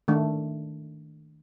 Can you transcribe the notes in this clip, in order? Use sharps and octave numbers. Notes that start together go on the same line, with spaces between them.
D#3 A3 D4